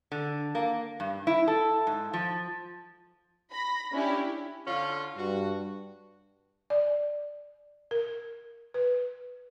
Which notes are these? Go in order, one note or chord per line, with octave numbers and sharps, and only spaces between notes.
D3
A#3
G2
E4
A4
G#2
F3
B5 A#6
C#4 D4 E4 G4
D3 C#4 F4
G2 F#4
D5
A#4
B4